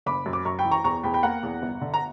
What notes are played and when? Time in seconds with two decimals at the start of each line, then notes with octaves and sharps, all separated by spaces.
0.06 F#1 B5 D6
0.26 F#2
0.33 D6
0.45 F#2 A#5 C#6
0.59 G5 B5
0.65 E3
0.71 A#5 C#6
0.84 E2 A#5 C#6
1.03 E2 G5 B5
1.14 G5 B5
1.23 A#3 F#5 A#5
1.43 E2
1.62 G1
1.81 D3
1.94 A#5